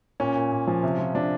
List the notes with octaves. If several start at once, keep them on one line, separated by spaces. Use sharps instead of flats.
A#2 C#4
A#2
A#2
F3
C3
F3
F3 D4